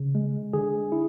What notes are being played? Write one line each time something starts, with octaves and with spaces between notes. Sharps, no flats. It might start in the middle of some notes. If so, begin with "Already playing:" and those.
Already playing: C#3
G#3
D3 G#4
E4